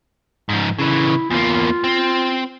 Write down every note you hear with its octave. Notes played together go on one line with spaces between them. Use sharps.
G#2 F3
C#3 E3 E4
E2 A#3 F4
C4